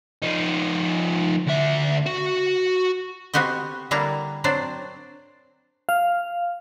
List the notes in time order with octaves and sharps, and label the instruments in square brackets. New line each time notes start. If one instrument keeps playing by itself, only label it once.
[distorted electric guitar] F3 D#4
D2 E5
F#4
[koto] B3 C4 F#4 G4 D#5
D3 G3 A#3 D4 E4 A#5
F#3 C4 D4 C5 D5
[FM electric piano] F5